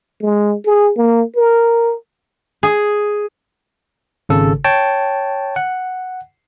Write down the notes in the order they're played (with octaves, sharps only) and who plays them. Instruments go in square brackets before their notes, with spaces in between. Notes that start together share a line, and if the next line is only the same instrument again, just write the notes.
[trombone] G#3
G#4
A#3
A#4
[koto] G#4
[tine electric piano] G#1 C#3 A4
C#5 G5 A5
F#5